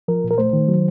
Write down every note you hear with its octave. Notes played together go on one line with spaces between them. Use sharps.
F3 A#4
A#2
A#4
A3 C5
D#3
F#3